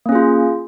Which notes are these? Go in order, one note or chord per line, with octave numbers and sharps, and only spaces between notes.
A#3 C#4 F4 G#4